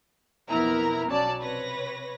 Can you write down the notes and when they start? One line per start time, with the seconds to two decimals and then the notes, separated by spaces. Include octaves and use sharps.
0.50 B1 F2 B3 E4 A#4 A#5
1.08 B1 F#3 C#4 D5 A5
1.41 C3 B4 C#5 A#6